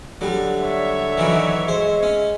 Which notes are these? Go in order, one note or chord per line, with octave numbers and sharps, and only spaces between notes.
D3 F#3 G3
C#5 E5
D#3 E3 F#3
G#3 C5
C#4